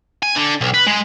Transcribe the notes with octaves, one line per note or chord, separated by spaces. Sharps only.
G#5
D3
B1
B4
G#3